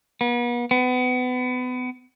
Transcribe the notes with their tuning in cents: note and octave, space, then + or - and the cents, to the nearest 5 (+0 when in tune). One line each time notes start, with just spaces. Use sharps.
B3 -40
B3 +30